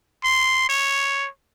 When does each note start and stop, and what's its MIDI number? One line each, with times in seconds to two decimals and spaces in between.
0.24 0.68 84
0.69 1.28 73